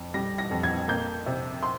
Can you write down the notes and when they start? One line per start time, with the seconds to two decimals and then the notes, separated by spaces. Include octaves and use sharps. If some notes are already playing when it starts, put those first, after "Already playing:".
Already playing: F2
0.14 G3 A#6
0.38 A#6
0.51 F2
0.63 G#6
0.88 A#3 G6
1.26 C3
1.63 C6